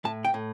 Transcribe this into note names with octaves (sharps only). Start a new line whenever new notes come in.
A2 A5
G5
A2